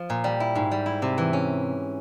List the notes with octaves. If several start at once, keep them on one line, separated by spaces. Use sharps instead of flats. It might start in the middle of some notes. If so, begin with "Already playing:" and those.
Already playing: F3
A#2
G3
E4
G#2
G3
E4
C3
E3
C#4